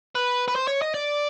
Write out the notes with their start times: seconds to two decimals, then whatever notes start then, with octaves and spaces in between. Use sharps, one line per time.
0.15 B4
0.48 B4
0.56 C5
0.68 C#5
0.82 D#5
0.94 D5